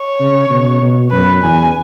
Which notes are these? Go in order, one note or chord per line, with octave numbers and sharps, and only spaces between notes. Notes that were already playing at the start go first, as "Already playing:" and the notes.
Already playing: C#5
C#3
B2
B2
F#2 B4
E2 G#5